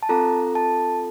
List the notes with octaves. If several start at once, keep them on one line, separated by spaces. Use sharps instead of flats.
A5
C4 F4 A4 A#5
A5